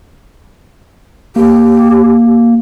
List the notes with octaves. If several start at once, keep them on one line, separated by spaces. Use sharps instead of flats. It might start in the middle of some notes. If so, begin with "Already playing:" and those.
A#3 G4